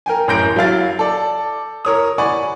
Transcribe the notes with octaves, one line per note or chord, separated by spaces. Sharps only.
A#4 G5 G#5
A1 F#2 A#4 G6 A#6 D7
F#3 E4 F5 A6
A4 D5
A#4 C#5 D#6
D5 F#5 G#5 B5 C#6